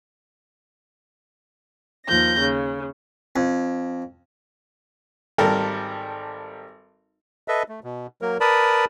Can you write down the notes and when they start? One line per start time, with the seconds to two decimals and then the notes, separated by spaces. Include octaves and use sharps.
2.06 D#2 F3 G6 A#6
2.40 C#3
3.36 F2
5.38 G#1 G3 A4 A#4
7.48 A4 B4 D#5 E5
7.69 A3
7.84 B2
8.22 F#3 A#3 A#4
8.41 A#4 B4 D5 A5 B5 D#6